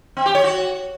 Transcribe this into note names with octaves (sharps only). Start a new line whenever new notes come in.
C4
G4
C#5
F#4